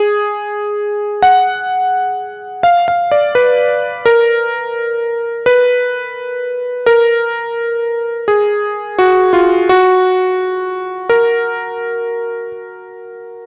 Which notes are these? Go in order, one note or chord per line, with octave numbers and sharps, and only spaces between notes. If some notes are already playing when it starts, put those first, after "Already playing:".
Already playing: G#4
F#5
F5
F5
D5
B4
A#4
B4
A#4
G#4
F#4
F4
F#4
A#4